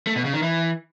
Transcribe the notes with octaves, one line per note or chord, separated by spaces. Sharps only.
A3
B2
C#3
D#3
E3